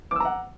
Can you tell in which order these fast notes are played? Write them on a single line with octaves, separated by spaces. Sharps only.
D6 E6 A#5 F#5